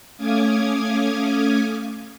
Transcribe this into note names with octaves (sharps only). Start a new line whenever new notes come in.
A3 C#4 F5 D6 D#6 G#6